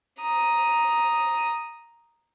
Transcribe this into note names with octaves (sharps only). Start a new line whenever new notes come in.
A#5 D#6